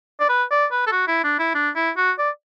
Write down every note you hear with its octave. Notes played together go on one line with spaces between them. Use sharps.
D5
B4
D5
B4
A4
F#4
E4
D4
E4
D4
E4
F#4
D5